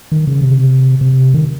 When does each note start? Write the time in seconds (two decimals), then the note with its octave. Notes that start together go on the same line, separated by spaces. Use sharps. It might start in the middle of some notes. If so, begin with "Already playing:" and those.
0.12 D#3
0.27 C#3
0.42 C3
1.01 C3
1.34 D#3